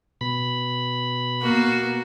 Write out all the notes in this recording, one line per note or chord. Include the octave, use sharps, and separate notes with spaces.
B2 B5
A#3 B3 F#4